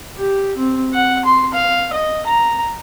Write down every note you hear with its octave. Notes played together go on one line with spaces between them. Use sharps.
G4
C4
F#5
C6
F5
D#5
A#5